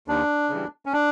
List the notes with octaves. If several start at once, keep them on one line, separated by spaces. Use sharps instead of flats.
D#2 D4
C#3 E3 G3
C#4
D4